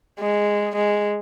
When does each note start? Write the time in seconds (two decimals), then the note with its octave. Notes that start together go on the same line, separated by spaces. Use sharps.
0.20 G#3
0.76 G#3